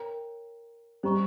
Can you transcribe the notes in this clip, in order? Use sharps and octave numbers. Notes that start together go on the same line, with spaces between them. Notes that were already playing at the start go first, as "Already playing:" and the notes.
Already playing: A#4 C#5 G5 A#5
G3 C5 D#5 A#5 C#6